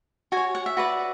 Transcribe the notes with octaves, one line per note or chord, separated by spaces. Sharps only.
F#4 C#5 G#5
F#5
E5
F#4 B4 D5